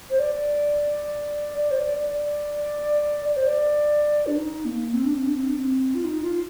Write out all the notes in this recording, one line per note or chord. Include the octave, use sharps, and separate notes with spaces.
C5
D5
D5
C5
D5
D5
D5
D5
C5
D5
D4
D#4
A#3
C4
D4
C4
D4
C4
D4
C4
F4
D#4
F4